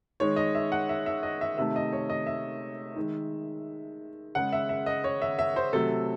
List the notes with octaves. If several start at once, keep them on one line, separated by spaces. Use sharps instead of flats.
D#3 G#3 C#5
D#5
E5
F#5
E5
E5
D#5
E5
C3 D#3 A3 E5
D#5
C#5
D#5
E5
D#3 G#3
C#3 G#3 F#5
E5
E5
D#5
C#5
E5
E5
C5
C3 F#3 A3 A4